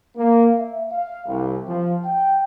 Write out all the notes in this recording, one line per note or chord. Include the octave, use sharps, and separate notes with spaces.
A#3
E5
F5
C2
F3
G5